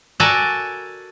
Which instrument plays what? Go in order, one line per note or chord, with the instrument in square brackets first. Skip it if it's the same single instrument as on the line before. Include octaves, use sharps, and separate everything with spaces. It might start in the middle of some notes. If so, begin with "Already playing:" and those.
[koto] F#4 A4 A#4 D5 G#5